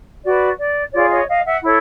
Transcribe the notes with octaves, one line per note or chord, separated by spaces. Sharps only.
F#4 B4 D5
D5
F4 G#4 C#5 D5
C#5 D#5
D#5 F5
E5 F#5
E4 A4 C#5